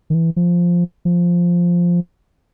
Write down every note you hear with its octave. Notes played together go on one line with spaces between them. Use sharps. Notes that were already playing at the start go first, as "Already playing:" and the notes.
D#3
E3
F3
F3